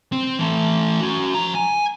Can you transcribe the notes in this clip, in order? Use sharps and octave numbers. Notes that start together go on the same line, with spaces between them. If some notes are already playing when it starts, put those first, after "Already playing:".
C4
E3 A3
C#4 F#4
F3 A#5
G#5